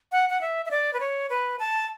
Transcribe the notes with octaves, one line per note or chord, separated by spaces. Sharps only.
F#5
F#5
E5
E5
D5
B4
C#5
B4
A5